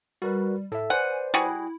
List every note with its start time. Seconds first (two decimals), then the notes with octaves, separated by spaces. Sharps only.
0.22 G3 F#4 A#4 B4
0.72 A2 A4 E5
0.90 B4 C5 D5 F#5 G#5
1.34 G3 E4 F#4 G#4